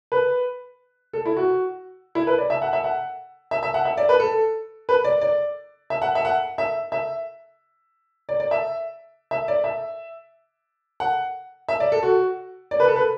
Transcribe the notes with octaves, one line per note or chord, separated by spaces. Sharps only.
B4
A4
E4
F#4
E4
B4
D5
E5
F#5
E5
F#5
E5
E5
F#5
E5
D5
B4
A4
B4
D5
D5
E5
F#5
E5
F#5
E5
E5
D5
D5
E5
E5
D5
E5
F#5
E5
D5
A4
F#4
D5
B4
A4
B4